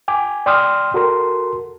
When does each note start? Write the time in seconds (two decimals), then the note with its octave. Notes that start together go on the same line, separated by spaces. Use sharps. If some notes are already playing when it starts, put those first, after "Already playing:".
0.08 G5 G#5 D6
0.46 D5 G5 C6 D#6 F6
0.94 F#4 A4 A#4 C6